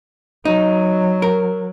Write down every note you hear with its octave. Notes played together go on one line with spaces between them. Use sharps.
F#3 D#4
A#4